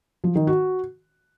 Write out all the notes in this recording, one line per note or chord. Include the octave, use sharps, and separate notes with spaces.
F3
D#3
F#4